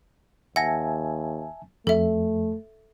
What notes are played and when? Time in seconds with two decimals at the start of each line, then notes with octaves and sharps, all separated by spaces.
0.56 D#2 E5 F#5 G#5 A5 A#6
1.87 F2 A3 A4 E5